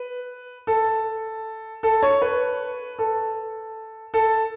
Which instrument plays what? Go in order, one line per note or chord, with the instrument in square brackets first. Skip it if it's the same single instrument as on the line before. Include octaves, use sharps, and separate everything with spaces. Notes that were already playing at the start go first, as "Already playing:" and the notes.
Already playing: [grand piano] B4
A4
A4
C#5
B4
A4
A4